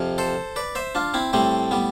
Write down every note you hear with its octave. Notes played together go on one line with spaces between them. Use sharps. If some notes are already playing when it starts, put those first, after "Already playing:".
Already playing: F2 C3 F3
A4 C5
B4 D5
C5 E5
D4 F4
C4 E4
A2 G3 A3 C4
G3 B3